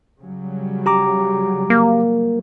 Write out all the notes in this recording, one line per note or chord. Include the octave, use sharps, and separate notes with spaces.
C#3 F#3 G3
G4 A#5 D6
A#3